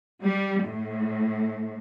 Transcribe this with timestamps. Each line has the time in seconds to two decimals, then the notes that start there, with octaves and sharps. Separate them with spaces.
0.21 G3
0.63 A2